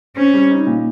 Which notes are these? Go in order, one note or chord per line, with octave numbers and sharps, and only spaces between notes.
C4 C#4
G3
D#4
A#2